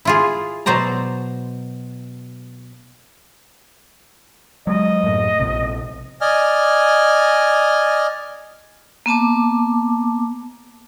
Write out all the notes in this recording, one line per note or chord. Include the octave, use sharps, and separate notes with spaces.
E4 F4 G#4
B2 F#3 C5 D5 A#5
F#3 G#3 D#5
F#2 A2
A#1 C3
D5 D#5 G#5 F6
A#3 B3 A5 D6